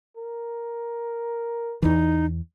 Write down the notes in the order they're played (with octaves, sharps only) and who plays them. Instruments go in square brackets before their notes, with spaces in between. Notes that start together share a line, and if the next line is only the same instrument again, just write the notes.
[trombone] A#4
[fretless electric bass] E2 E3 [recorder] D#4